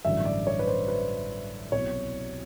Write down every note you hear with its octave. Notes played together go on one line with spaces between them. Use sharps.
A1 G2 D3 F#3 E5
D5
C#5
B4
C5
B4
C2 B2 F#3 C#5